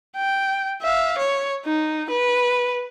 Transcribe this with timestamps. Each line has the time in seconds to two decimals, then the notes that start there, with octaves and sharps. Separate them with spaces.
0.16 G5
0.82 E5 F5
1.18 C#5
1.65 D#4
2.10 B4